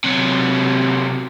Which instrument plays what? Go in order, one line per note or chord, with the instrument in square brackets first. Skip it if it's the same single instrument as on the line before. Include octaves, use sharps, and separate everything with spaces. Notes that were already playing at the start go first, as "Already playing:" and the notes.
[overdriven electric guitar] C3 F#3